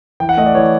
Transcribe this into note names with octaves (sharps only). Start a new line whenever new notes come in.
E3 G5
F#5
A3 D#5
D5
E3 C#5